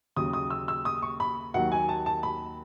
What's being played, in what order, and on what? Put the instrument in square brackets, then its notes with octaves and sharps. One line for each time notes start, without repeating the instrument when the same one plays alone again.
[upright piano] D#2 C#3 F#3 D#6
D#6
E6
E6
D#6
C#6
B5
D#2 D#3 F#3 F#5
G#5
A5
A5
B5